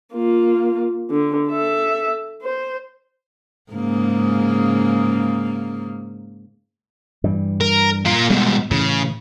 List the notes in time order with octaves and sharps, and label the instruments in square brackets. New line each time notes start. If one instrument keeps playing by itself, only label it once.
[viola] A#3 F4
D3
A4 E5
C5
[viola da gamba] G#2 C#3 A#3
[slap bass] G2 E3 G3
[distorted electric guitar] A#4
A#3 F4
[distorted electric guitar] G#2 B2 [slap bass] G3 B3
[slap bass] A2 E3 [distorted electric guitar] C#3